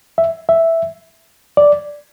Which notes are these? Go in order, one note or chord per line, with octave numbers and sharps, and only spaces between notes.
E5
E5
D5